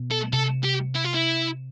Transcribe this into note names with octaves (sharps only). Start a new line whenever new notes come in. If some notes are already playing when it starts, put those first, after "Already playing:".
Already playing: B2
A4
C3 A4
G4
E4
F4
E4